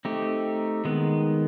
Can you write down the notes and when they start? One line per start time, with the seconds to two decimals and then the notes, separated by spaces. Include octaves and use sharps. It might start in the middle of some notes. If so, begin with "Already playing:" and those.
0.05 A3 C4 D#4 G4
0.85 D#3 G#3 B3